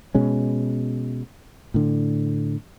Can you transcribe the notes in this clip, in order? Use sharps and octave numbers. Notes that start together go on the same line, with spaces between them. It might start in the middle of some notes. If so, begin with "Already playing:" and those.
B2 G#3 C#4
A2 D3